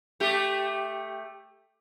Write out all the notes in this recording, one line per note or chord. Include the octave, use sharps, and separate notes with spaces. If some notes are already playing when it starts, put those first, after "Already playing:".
A3 G4